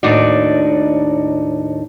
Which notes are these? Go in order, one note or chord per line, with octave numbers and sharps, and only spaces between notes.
D#2 A2 D4 D#4 F#4 D5